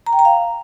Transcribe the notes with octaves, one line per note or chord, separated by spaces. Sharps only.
A#5
G5
A#5
F5